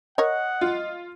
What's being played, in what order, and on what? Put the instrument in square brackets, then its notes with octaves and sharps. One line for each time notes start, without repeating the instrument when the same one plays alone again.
[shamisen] A#4 C#5 [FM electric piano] D#5 [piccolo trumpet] F#5
[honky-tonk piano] F4